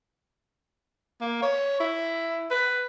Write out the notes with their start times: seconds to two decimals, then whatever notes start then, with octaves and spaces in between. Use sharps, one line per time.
1.21 A#3
1.42 C#5
1.80 E4
2.50 B4